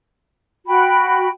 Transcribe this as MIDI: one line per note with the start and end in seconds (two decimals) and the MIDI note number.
0.66 1.28 66
0.66 1.28 79
0.66 1.28 83